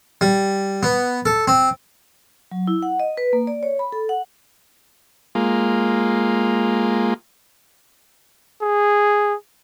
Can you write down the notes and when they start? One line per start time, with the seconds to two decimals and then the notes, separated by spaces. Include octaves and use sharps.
0.21 G3
0.83 B3
1.26 A4
1.48 C4
2.51 F#3
2.68 E4
2.83 F#5
3.00 D#5
3.17 B4
3.33 A#3
3.47 D5
3.63 C#5
3.79 B5
3.92 A4
4.09 F#5
5.35 G#3 A#3 F4
8.62 G#4